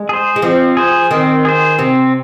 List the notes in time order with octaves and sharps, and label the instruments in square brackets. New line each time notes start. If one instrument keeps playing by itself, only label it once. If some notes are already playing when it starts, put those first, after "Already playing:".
Already playing: [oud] G#3
[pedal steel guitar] G#4 C5
[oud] G#3
[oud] F3 [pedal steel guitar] C4
[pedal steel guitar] G#4 C5
[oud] D#3 [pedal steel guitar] C4
[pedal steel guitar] G#4 C5
[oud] C3 [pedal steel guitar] C4